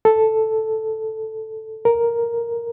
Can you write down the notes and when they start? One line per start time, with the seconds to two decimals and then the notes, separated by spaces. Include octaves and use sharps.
0.05 A4
1.85 A#4